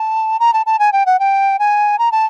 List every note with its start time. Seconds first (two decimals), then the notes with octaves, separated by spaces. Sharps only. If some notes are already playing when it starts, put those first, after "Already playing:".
Already playing: A5
0.40 A#5
0.53 A5
0.66 A5
0.79 G#5
0.93 G5
1.06 F#5
1.19 G5
1.59 G#5
1.99 A#5
2.12 A5